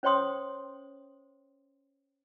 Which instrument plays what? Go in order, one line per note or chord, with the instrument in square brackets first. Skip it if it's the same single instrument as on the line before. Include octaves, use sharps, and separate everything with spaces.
[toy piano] C#4 C5 C#5 G5 C6 D#6